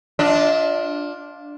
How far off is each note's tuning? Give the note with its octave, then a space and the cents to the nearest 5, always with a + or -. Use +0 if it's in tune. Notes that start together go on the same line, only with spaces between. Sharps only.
D4 -10 F4 +10 D#5 +40